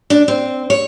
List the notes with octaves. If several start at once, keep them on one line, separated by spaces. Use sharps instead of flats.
D4
C4
C#5